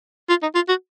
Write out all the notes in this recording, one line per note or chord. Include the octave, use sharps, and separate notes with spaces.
F4
D#4
F4
F#4